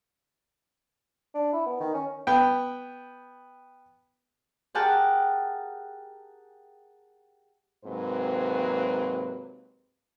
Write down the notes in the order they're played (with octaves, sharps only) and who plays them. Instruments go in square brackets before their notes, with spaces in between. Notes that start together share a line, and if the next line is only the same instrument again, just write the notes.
[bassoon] D4
E4
B3
D#3
C#4
[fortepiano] B3 G5
[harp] G4 G#4 A#4 F#5 G5 A5
[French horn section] G#2 C3 F#3 A#3 C4 B4